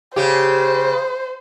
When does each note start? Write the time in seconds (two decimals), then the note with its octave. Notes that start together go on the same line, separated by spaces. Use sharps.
0.16 C#3 G4 C5